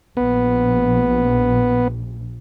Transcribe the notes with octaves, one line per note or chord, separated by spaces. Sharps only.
A#1 B3